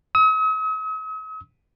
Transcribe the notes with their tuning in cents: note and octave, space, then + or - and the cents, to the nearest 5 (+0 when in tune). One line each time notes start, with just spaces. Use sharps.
D#6 +45